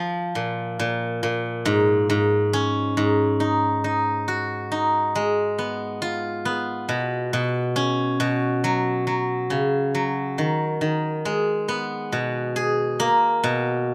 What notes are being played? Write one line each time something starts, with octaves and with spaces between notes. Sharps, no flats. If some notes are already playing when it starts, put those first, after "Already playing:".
Already playing: F3
A#2
A#2
A#2
G#2
G#2
C#4
G#2
D#4
D#4
F#4
D#4
G#3
B3
F4
B3
B2
B2
C#4
B2
F#3
F#3
C#3
F#3
D#3
D#3
G#3
B3
B2
G#4
A#3
B2